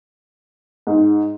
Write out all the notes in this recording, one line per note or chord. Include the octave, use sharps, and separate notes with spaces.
G#2